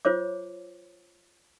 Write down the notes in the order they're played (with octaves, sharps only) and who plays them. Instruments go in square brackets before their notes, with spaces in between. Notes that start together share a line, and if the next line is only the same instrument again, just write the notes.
[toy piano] F4 C5 C#5 D6